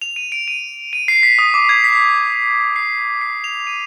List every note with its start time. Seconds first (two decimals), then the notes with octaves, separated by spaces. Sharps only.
0.02 F7
0.16 D#7
0.32 D7
0.48 D#7
0.93 D#7
1.08 C7
1.23 B6
1.39 D#6
1.54 D6
1.69 G#6
1.84 B6
2.76 C7
3.21 C7
3.44 F7
3.67 D#7